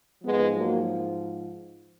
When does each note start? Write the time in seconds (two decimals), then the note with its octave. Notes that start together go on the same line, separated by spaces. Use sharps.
0.24 G#2 F3 G#3 B3
0.56 F#3 A#3